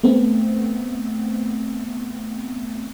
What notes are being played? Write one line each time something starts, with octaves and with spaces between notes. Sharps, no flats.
A3 B3 C4